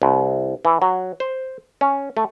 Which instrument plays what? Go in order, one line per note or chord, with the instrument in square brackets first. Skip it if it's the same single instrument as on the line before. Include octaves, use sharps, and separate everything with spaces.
[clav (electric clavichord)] C2
E3
F#3
C5
C#4
A3